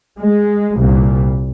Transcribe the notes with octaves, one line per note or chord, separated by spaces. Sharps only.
G#3
C2 A#2